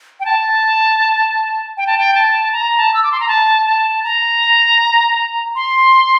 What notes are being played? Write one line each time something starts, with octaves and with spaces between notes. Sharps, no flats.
G5
A5
G5
A5
G5
A5
A#5
A5
E6
D6
C6
A#5
A5
A5
A#5
C6